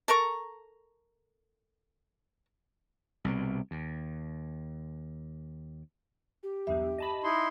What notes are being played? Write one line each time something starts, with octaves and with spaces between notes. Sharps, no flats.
A4 A#4 A#5 C#6
C2 B2
D#2
G4
B1 E2 G2 E5
D#5 A5 B5
D#4 E4 C6